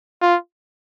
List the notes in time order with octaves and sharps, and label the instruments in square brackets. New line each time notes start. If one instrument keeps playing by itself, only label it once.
[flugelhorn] F4